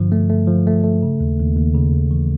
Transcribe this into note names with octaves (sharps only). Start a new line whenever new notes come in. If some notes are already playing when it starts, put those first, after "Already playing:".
Already playing: G2 D3 F3
A3
A3
F3
A3
A3
C#3
D#2
D#2
D#2
C#3
D#2
E3